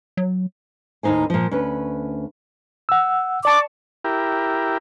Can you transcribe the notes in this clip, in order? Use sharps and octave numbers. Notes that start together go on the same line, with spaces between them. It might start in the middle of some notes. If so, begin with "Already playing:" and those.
F#3
D#2 A2 C#3 D#4 C5 G#5
A#2 F3
D2 C#4 B4
F#5 E6
D5 A5 C#6 D6
E4 G4 A#4